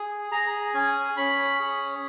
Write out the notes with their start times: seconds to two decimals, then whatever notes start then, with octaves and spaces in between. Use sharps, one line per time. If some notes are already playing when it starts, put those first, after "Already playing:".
Already playing: G#4
0.31 G#4 A#5
0.74 C#4 G#5
1.17 C#4 B5
1.60 G#4